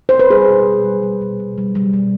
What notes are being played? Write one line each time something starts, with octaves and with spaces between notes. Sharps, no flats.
C5
B4
G3 G#4
B2
B2
G3
G3
B2
B2
G3
G3
B2